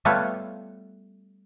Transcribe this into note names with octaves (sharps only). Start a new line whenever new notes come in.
G3 A3 B3 F4 C#5